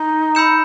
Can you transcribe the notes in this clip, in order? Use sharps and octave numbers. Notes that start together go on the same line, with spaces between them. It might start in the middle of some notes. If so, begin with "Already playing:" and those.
Already playing: D#4
B5 E6 G6 C#7 E7